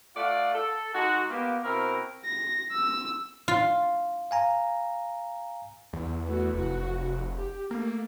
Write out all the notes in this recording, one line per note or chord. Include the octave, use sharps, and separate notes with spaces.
A3 F4 D5 F5 F#5
A4
G#3 D#4 F#4
A#3 B3 F4 G4
B2 C4 E4 A#4
A#6
E6
F4
F5 G#5 A#5
E2
E3 A3 F#4
F1 F#4
G4
A3 A#3